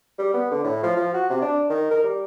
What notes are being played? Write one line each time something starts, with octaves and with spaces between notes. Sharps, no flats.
G3
B3
D3
A2
F3
F3
F#4
C3
D4
D#3
A#4
G3